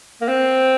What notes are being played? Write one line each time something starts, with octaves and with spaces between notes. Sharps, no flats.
A#3
C4